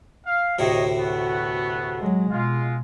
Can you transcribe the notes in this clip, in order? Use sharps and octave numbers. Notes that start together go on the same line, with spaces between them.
F5
D2 A2 C3 C#5 D#5
A3 B3 F#4
F#3 G#3
B2 G#3 F4